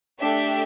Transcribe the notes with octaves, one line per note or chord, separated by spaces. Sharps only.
A3 D4 G4 E5